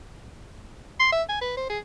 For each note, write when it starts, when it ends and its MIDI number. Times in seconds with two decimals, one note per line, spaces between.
1.00 1.09 84
1.13 1.23 76
1.29 1.41 80
1.41 1.57 71
1.57 1.67 72
1.70 1.79 68